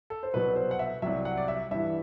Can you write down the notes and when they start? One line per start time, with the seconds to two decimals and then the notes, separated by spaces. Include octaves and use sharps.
0.10 A4
0.23 C5
0.33 C2 B2 F#3 B4
0.56 C5
0.71 F#5
0.79 E5
1.02 C2 C3 F#3 E5
1.25 F#5
1.37 D5
1.48 E5
1.71 G2 E3 E5